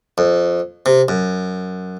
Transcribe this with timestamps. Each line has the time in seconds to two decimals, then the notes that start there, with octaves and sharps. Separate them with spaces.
0.18 F2
0.86 C3
1.08 F#2